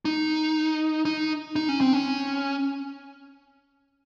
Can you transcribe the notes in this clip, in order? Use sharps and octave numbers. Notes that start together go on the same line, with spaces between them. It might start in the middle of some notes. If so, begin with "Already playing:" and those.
D#4
D#4
D#4
C#4
C4
C#4